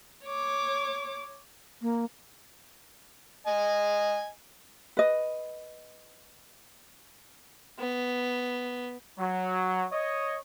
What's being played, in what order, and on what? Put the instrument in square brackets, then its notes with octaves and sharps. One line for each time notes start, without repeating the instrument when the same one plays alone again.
[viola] C#5 D6
[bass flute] A#3
[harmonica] D#5 G#5
[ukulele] B4 D#5
[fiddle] B3
[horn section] F#3
C#5 D#5